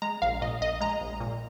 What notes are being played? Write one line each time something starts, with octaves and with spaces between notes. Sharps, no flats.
G#3 A#5
A#1 F5
A#2 D#5
A#1 D#5
G#3 A#5
A#1
A#2